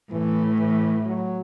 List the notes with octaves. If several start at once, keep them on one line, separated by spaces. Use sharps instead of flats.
A2 E3
E3
F#3